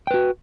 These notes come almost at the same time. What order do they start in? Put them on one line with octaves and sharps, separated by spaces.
G5 B4 F#4